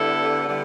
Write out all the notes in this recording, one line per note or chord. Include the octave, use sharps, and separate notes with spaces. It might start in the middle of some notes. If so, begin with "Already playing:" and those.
Already playing: D3 G3 B3 E4 A4
D3 G3 B3